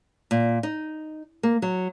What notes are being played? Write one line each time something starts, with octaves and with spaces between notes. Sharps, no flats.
A#2
D#4
A#3
F#3